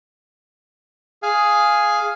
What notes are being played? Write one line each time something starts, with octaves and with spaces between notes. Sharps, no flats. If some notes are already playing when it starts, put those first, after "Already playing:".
G#4 F5 G#5